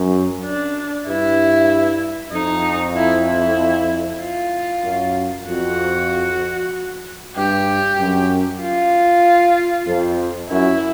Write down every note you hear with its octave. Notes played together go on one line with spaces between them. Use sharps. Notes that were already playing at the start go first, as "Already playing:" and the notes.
Already playing: F#2
D4
G2 E4
F2 D#4
E4
E4
F4
F#2
F2 F#4
G2 G4
F#2
F4
F2
F#2 E4